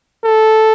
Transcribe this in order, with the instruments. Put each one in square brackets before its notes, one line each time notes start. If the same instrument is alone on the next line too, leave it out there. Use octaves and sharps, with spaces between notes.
[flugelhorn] A4